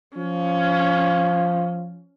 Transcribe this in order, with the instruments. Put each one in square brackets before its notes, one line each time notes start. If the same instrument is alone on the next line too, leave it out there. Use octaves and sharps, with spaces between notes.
[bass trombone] F3 [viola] C#4